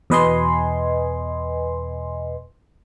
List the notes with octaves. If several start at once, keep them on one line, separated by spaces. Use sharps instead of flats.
E2 B2 B4 D#5 G#5 C6